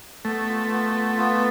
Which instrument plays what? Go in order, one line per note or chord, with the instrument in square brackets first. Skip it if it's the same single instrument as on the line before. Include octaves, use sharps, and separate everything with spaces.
[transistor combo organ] A3 [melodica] B3
[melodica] F4
B3
F4
B3